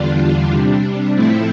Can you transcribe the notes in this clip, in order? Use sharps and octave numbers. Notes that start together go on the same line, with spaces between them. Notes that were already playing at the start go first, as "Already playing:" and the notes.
Already playing: E2 D3 G3 D4 F4
C3 G3 D4
A2 F3 A3 C4 E4